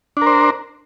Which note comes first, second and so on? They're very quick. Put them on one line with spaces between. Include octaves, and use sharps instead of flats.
D4 A#4 C5